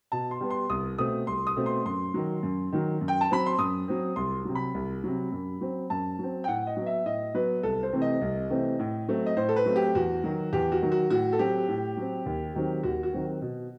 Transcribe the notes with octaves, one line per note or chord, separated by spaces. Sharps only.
B2 A5
C6
G3 B3
C6
C2 D#6
B2 A3 C4 D#6
C2 C6
D#6
B2 A3 C4
C6
F#2 C6
D#3 F#3
F#2
D#3 F#3
F#2
G5
A5
F#3 C4 B5
C6
F#2 D#6
F#3 C4
C2 C6
C3 F#3
B5
C2
C3 F#3
F#2
F#3 C4
F#2 A5
F#3 C4
G5
A2 F#5
D#5
F#3 B3
E5
A2 D#5
F#3 B3 B4
C2 A4
C5
C3 E3 A3 C4
D#5
C2
C3 E3 A3 C4
A2
F#3 A3 C4
D#5
A2 C5
A4
B4
F#3 A3 C4
G4
E2 F#4
D#3 F#3
E2 G4
F#4
D#3 F#3
F#4
A2 F#4
A4
F#3 C4 G4
A2
F#3 C4
D#2
D#3 F#3 C4
D#2 F#4
F#4
D#3 F#3 C4
B2